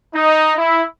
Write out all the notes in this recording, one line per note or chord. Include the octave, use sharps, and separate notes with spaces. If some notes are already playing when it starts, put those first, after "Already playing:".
D#4
E4